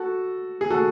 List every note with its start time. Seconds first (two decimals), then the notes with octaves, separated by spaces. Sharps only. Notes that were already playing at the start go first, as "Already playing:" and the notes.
Already playing: F#4 A4
0.61 G#4
0.70 F#4 A4